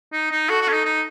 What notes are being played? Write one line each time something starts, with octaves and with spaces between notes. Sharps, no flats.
D#4
D#4
F#4 A4
F#4
C#4
D#4
D#4